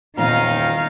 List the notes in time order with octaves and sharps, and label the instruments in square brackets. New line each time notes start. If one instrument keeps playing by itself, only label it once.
[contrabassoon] D#1 [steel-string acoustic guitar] E2 A#2 A#5 [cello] D#3 D#4 [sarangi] F5